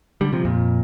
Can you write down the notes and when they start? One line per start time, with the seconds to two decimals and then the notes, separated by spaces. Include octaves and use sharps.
0.21 D3 G3
0.32 C3 F3
0.45 F2 A#2